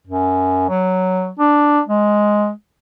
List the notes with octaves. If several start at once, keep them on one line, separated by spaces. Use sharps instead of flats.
F#2
F#3
D4
G#3